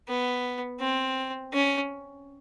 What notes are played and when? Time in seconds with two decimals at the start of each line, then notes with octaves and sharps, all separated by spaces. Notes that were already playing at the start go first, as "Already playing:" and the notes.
0.08 B3
0.81 C4
1.53 C#4